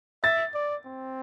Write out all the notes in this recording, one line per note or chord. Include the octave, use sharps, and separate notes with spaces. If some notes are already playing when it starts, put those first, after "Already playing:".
E5 A6
D5
C4